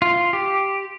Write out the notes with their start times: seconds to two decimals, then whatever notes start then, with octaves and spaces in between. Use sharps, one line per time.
0.02 F4
0.33 G4